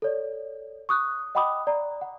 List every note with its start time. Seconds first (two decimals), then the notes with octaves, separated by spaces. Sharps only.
0.02 A4 C#5 D5
0.89 C#6 D#6 F#6
1.35 D#5 F#5 G5 B5 D6 D#6
1.67 D5 A#5
2.01 F#5